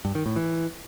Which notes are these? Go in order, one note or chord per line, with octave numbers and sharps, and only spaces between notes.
G2
D#3
A2
E3